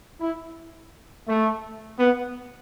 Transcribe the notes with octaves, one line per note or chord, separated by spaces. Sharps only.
E4
A3
B3